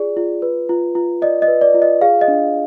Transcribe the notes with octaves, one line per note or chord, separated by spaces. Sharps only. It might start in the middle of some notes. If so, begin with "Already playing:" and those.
Already playing: F4 G#4 D5
F4
B4
F4
F4
D5 D#5
D#5
B4
D5
F4
D#5
G#4 F5
D#5
D4